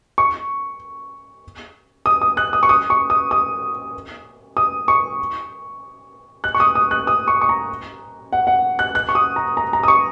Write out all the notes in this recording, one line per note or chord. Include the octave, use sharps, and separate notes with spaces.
C#6
D#6
D#6
F#6
D#6
C#6
D#6
C#6
D#6
D#6
D#6
C#6
F#6
C#6
D#6
D#6
F#6
D#6
C#6
C#6
A#5
F#5
F#5
F#6
F#6
C#6
D#6
A#5
A#5
A#5
D#6
C#6